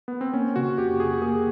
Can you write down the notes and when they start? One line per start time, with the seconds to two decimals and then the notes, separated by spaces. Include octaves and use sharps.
0.08 B3
0.21 C4
0.34 A#3 C#4
0.56 C#3 F#4
0.78 F2 G4
1.00 C#3 G#4
1.22 A#3 G#4